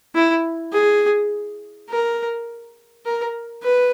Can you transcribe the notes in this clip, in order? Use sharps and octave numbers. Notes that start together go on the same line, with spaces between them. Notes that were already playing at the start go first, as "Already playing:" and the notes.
E4
G#4
A#4
A#4
B4